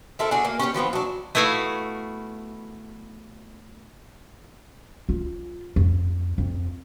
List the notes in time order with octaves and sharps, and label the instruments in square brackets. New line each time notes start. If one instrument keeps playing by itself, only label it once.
[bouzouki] C4 E4 A4 A#4
D4 F#4 G#4 A4
A#3
C#4 G4 B4 C#5
E3 F3 B3 C4
F#3 D4
[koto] A3 B3 E4 F#4 F5
[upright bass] F4
F2
F2